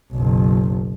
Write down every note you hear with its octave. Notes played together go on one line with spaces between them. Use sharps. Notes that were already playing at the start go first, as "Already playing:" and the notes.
F#1 B1